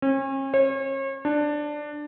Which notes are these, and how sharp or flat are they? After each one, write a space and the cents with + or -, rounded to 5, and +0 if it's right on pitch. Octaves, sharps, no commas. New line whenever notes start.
C#4 -40
C#5 -40
D4 +10